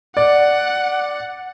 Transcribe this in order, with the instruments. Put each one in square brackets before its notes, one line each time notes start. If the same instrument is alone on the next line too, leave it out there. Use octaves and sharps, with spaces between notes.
[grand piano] D5 [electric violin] F#5